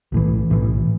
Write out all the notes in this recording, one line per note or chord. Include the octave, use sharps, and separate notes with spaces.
B1 A2 E3
B1 A2 E3